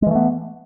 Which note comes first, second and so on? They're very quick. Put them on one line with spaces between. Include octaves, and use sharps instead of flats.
G#3 E3 A3 B3